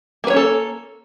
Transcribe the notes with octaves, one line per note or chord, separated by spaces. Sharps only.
A#3 C#4 A4 B4 C#5